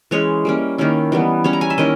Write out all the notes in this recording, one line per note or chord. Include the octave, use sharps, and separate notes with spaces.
E3 G#3 C#4 C#5
G3 A#3 C#4
D#3 A#3 C#4 E4
E3 G3 B3
G3 C#4 E4 C#5
A#5
G#5
E5
D#3 A#3 C#4 E4 D#5